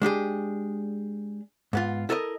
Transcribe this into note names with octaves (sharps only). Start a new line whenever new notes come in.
G#3 D4 G4 G#4
G#2 B3 F4
E4 A4 A#4 C#5 D#5